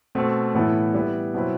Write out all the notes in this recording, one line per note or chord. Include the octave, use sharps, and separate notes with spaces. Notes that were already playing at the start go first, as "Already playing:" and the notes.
B2 A3 C4
A2 E3 B3 E4 A4
G3 B3 E4
B2 F#3 C4 E4 B4